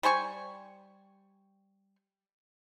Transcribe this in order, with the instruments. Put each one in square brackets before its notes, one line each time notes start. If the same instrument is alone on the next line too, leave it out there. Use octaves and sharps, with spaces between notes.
[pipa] G3 C5 G#5 C#6